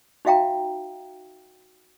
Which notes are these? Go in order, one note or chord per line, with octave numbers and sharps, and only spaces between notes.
D#4 F#4 E5 F5 G5 A#5